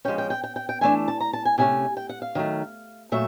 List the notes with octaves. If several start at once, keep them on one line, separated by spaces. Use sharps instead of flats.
F3 G#3 C#4 G5
G5
G5
G5
G5
G5
E3 A3 D4 G#5
A5
A#5
A5
G#5
C3 F3 A3 C#4 G#5
G5
F#5
F5
D#3 F#3 A3
A#2 F#3 A3 E5